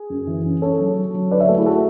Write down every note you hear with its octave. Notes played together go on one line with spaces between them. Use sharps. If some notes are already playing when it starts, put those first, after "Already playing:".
Already playing: G#4
F#2
E3
C#4
C#4 A4 C#5
F#3
F#3
F#3
D3 B4 D5
C#5 E5
A3 F#4 A4
E4 G#4
F#4 A4